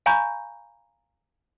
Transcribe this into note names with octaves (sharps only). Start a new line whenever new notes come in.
F5 G#5 A#5 B5 C#6 G6